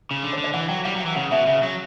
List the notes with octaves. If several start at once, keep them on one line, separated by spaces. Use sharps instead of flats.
C#3
D3
C#5
D3
D5
E3 F#5
F#3 G5
G3 F#5
F#3
F#5
E3
C#3 F#5
B2 E5
C#3 E5
F#3